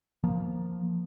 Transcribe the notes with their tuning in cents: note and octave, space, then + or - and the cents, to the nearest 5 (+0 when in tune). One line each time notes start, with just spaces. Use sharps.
F3 +0 A#3 +0